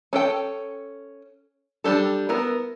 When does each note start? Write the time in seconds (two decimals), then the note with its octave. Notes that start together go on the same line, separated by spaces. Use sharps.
0.13 C#4 A4 G5
1.84 G3 D4 G4 A4
2.29 B3 E4 A#4